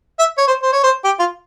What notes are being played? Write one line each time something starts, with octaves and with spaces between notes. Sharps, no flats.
E5
C#5
C5
C5
C#5
C5
G4
F4